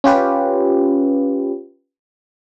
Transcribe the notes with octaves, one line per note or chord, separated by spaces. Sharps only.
C#4 F4 G4 B4